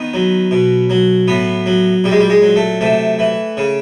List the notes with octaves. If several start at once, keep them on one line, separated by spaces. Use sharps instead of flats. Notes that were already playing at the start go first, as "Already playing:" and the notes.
Already playing: D#3 B3
F#3
B2
F#3
A2 B3
F#3
A#2 G3
G#3
G3
G#3
F#3
A3
C3 A3
E3
C#3